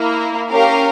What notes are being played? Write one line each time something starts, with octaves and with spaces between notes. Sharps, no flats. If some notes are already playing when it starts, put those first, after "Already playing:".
Already playing: A#3 E4 A#4
C#4 G4 A#4 F5